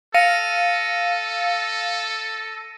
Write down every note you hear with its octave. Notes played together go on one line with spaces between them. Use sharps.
A4 F5 A#6 C#7 D#7